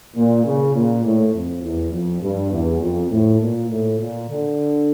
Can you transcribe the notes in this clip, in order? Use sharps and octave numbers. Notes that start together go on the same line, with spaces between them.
A#2
C#3
A#2
A2
F2
E2
F2
G2
E2
F2
A2
A#2
A2
A#2
D3